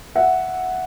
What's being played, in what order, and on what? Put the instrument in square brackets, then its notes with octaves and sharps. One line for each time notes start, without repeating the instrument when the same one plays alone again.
[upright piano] E5 F#5